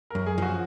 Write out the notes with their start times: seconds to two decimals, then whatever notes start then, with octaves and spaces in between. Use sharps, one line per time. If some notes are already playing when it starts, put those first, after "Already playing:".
0.10 F#2 A#4
0.26 G#4
0.38 F3 F#4